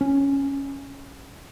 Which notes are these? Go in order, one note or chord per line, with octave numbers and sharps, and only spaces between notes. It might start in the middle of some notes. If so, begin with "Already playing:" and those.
C#4